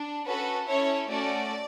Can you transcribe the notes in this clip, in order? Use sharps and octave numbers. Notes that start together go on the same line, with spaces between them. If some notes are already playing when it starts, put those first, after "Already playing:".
Already playing: D4
C#4 F#4 A4 B4
C#4 E4 A4 C#5
A3 C#4 F#4 D5